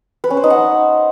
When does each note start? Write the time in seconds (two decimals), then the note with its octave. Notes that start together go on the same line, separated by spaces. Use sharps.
0.24 B4
0.30 C#4
0.37 C5
0.44 D#4
0.50 F#5